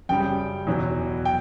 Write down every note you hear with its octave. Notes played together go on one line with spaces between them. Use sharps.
F#2 C#3 G3 G5
E2 B2 F#3
G5